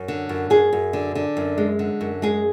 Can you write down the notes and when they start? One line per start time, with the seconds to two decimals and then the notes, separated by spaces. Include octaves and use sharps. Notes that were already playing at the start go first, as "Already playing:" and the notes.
Already playing: F#2
0.08 D3
0.29 F#2
0.50 F#2 G#4
0.73 F#2
0.93 D3
1.15 D3
1.37 F#2
1.58 G#3
1.79 D3
2.01 F#2
2.22 G#3 G#4